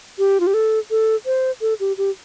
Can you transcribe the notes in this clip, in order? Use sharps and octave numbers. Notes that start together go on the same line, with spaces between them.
G4
F4
G4
A4
A4
C5
A4
G4
G4